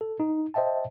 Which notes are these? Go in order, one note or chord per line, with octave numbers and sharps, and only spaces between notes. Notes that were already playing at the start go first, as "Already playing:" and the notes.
A4
D#4
C5 D#5 E5 G5 A5